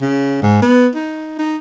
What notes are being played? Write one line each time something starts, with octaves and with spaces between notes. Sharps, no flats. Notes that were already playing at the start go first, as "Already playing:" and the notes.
C#3
G#2
B3
D#4
D#4